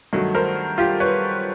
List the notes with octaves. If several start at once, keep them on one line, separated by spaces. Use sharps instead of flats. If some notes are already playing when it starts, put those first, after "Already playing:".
G2 D#3 F#3 A3
A#4 C5
F4 G4
B4 C#5